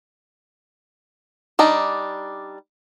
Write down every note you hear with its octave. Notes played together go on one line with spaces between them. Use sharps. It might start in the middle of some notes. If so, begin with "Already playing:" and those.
G3 D4 D#4